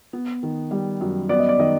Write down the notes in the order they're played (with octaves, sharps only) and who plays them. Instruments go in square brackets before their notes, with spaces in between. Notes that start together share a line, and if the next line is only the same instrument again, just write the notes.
[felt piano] B3
D#3
G3
F#2
[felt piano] B3 [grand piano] D5
[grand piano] D#5
D5
[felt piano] D#3 [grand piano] D#5